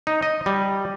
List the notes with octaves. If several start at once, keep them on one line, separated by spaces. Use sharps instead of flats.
D#4
D#5
G3